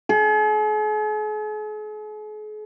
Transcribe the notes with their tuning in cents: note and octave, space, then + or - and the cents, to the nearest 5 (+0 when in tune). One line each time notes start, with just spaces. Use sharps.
G#4 +45